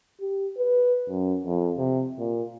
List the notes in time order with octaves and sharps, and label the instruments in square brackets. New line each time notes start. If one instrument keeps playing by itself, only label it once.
[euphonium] G4
B4
F#2
F2
C3
A#2